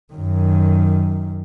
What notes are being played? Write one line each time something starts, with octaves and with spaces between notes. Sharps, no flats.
F#2 D#3